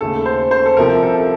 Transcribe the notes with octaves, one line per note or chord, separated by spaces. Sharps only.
D#2 C#3 A3 A4
C5
C5
A4
C2 C3 F3 A#4
A4